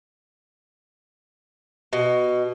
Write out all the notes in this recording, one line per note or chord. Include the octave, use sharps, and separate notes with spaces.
B2